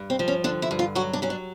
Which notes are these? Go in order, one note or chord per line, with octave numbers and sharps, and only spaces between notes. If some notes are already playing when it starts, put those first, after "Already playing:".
Already playing: G2
C4
F3
C#4
D3 D4
E4
G2
F4
F#3 F#4
D4
F#3 C#4
D4